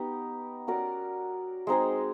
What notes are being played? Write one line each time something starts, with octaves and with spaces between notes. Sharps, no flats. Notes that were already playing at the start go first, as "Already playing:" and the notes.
Already playing: B3 D#4 G4
C#4 F#4 A#4 D5
G#3 C4 D#4 G#4